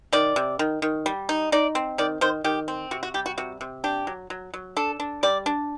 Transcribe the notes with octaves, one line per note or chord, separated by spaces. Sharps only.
D#3 D5
C3
D#3
D#3
G3
D#4
D#4 D5
C4
D#3 D5
D#3 C5
D#3 G4
C4
C3 F#4
F#4
G3 G4
F#4
C3 F#4
C3
D4 G4
F#3
F#3
F#3
D4 A4
D4
G3 D5
D4